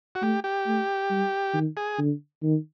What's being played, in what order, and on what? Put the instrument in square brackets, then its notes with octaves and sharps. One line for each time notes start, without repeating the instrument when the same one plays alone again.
[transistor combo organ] F#4
[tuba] A3 [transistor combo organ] G4
[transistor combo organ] G4
[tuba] A3
G3
D#3
[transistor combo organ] G#4
[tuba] D3
D#3